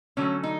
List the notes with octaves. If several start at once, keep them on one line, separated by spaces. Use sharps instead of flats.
D3 F#3 A3 C#4
D#4